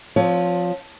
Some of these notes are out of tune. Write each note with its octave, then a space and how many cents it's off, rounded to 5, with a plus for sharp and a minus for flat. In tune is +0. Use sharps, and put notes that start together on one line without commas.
F3 +15 C4 +0 C#5 +25